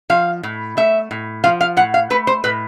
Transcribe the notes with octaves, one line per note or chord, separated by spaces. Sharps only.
F3 F5
A2
A3 E5
A2
F3 F5
F5
A2 F#5
F5
A3 B4
C5
A2 B4